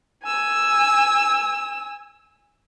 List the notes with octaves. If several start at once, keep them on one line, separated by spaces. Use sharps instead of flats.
G#5 E6